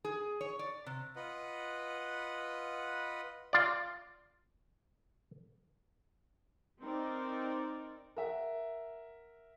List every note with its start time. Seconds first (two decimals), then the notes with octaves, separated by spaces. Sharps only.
0.05 G#4
0.41 C#5
0.59 D5
0.86 C3
1.16 F4 B4 D#5 F#5
3.53 F4 D5
6.81 C4 D#4 A#4 D5
8.16 A#4 E5 F#5